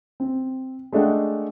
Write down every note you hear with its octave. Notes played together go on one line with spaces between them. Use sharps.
C4
G#3 A3 D4 D#5 F#5 G5